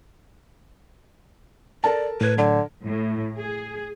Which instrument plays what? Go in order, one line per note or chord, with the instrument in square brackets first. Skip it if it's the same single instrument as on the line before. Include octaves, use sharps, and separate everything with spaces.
[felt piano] A4 A#4 A5 [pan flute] D5
[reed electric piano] A2 G#6 [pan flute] B4
[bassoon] D3 [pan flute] F#3
[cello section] A2
G#4